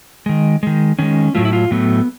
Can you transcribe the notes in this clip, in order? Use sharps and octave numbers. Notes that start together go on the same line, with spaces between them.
D#3 G#3
D#3 G#3
D#3 G#3 C#4
A2 F#3 A3 F4
E4
F4
A2 F#3 A3 B3